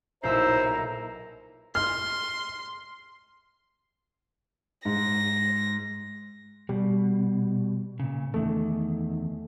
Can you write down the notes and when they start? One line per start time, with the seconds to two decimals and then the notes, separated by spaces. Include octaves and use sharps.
0.23 B1 A#2 D#4 E4 C5 E5 A#5
1.75 C6 F6
4.85 G#2 A#6
6.69 B2 G3
8.00 A#2 C#3
8.34 E2 D#3 A3